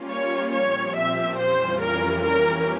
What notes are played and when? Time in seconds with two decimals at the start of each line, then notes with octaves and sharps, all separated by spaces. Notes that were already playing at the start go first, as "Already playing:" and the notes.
Already playing: G3 A#3 C#4 F4
0.09 C#5
0.52 A#2 F3 C4 G4 C#5
0.96 E5
1.38 F2 E3 G3 C#4 F4 C5
1.81 A#4
2.24 E3 A#3 C#4 G4 A#4 C#5